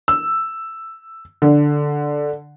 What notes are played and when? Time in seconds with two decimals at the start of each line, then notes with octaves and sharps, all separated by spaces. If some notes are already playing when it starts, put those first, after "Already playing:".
0.08 E6
1.42 D3